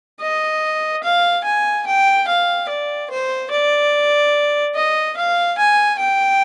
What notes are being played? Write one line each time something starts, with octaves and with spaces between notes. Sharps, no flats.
D#5
F5
G#5
G5
F5
D5
C5
D5
D#5
F5
G#5
G5